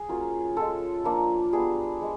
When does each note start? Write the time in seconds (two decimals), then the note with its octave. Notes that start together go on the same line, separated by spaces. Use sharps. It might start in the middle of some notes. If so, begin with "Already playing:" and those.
Already playing: G#4
0.09 F#3 A#3 C#4 F4
0.56 G#3 C#4 F4 A4
1.04 F3 A#3 D4
1.53 G3 B3 D4 G#4
2.00 F3 G#3